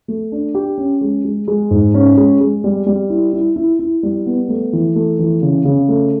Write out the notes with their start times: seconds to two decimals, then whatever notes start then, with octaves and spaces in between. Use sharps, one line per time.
0.08 A3
0.32 D4
0.54 G4
0.78 C#4
1.01 G#3
1.25 G#3
1.48 G#3
1.71 G#2
1.94 C#4
2.17 G#3
2.40 G#3
2.64 G3
2.87 G3
3.10 E4
3.33 E4
3.56 E4
3.79 E4
4.03 G3
4.26 B3
4.49 A3
4.73 E3
4.96 A3
5.19 E3
5.42 C#3
5.65 C#3
5.88 A3